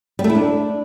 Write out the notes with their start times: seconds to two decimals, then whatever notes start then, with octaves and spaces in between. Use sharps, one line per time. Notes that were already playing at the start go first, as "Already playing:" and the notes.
0.19 G3
0.24 A3
0.29 E4
0.35 D4